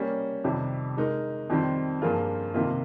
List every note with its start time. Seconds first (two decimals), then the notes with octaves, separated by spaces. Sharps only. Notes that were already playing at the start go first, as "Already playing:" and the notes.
Already playing: G3 A#3 C#4
0.44 F2 C3 D#3 G3
0.97 G#3 D#4 A#4
1.50 F2 D#3 G3 C4
2.02 G2 F3 A#3 F4 G#4
2.54 F2 C3 D#3 A#3 F4